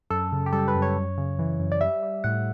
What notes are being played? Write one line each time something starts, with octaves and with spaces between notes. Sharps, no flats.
F#2 A4
C#3
G4
G3 A4
B4
F#2
C#5
F#2
C#3
E3
F#2
D5
G3 E5
G3
A2 F#5